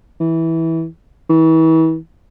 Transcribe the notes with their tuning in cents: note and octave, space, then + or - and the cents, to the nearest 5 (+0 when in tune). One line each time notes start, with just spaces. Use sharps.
E3 -15
E3 -35